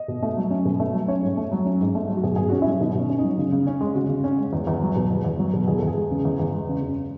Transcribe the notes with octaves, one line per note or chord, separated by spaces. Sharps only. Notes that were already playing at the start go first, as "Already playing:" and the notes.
Already playing: D#5
B2
A3
F#3
C#4
B2
A3
F#3
C#4 C#5
G#2
A3
F#3
C#4
G#2
A3
F#3
F#4
B2 G#4
B2 G#4
C#4 F#4
E4
F#3
B2 D#4
B2 C#4
C#4
F#3 D#4
C#3
C#3
C#4
G#3
C#3 F#4
C#3
C#4
G#3
E2
E2
F#3
B2
E2
E2
F#3
B2
E2 G#4
A4
E2
G#4
G#3
C#3
E2
E2
G#3
C#3
F#2